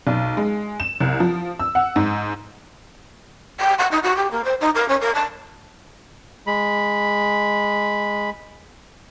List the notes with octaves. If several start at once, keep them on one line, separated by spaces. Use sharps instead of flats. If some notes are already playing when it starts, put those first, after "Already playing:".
B1
G#3
E7
C2
F3
E6
F#5
G#2
G5
F#5
D#4
F#4
G4
A#3
C5
D#4
A#4
C#4
A#4
A5
G#3 B5